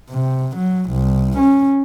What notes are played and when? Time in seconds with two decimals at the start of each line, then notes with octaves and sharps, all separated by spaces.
0.10 C3
0.57 F#3
0.91 C2
1.38 C#4